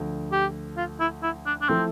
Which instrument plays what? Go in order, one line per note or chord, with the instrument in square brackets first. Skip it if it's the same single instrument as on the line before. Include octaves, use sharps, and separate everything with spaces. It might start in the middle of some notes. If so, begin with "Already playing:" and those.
Already playing: [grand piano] D2 D3 F3
[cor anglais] G4
F4
E4
E4
D4
D4
[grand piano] F3 A3 E4 A4 [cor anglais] C4